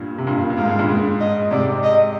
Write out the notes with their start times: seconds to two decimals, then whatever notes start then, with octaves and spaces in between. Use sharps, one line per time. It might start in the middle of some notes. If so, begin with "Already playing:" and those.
Already playing: G2 A#2
0.18 C3
0.27 G2 A#2
0.38 G2
0.50 G2
0.58 G#2 F5
0.69 G#2
0.79 G2 A#2
0.89 G#2
1.20 D#5
1.51 G#2 C3 D5
1.83 D#5